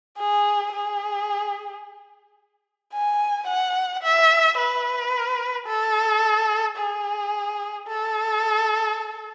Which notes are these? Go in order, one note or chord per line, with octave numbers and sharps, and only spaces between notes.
G#4
G#4
G#5
F#5
E5
B4
A4
G#4
A4